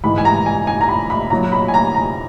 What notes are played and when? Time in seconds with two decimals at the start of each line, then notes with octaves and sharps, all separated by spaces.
0.04 G#2 E3 G#3 B5
0.18 G#5
0.25 A#5
0.46 G#5
0.67 G#5
0.81 A#5
0.88 B5
1.10 B5
1.30 A#2 F#3 A#5
1.52 B5
1.68 G#5
1.74 A#5
1.95 A#5